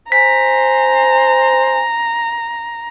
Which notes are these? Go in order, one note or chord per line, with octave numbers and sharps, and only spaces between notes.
C5 G#5 A#5 B6